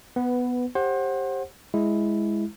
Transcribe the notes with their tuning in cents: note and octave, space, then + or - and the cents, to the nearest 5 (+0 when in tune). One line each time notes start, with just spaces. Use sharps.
B3 +0 B4 +15
G4 +5 C5 +30 F#5 +0
G#3 +0 E4 +0